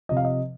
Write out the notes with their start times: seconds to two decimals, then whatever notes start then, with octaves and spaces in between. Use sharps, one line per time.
0.09 C3 F3 D#5
0.17 F5
0.25 D#5